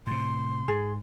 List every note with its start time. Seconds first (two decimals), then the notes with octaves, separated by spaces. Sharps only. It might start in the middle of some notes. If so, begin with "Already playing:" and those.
0.07 A2 C3 C6
0.68 G#2 G#4